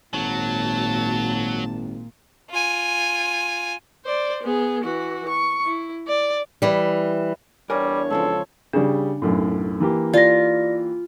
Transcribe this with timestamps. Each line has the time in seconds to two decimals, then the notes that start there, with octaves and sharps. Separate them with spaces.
0.14 G#1 A#2 F#3 A5
2.50 F4 G#5
4.05 C5 D5
4.43 B3 G#4
4.84 E3 F#4
5.29 C#6
5.64 E4
6.07 D5
6.62 E3 G3
7.70 E2 G3 D4 A#4 C#5 G#5
8.10 G#2 C#3 F3 A4
8.73 C#3 G3 D4
9.22 B1 F#2 A2
9.80 E3 A#3 G4
10.13 F4 D5 A#6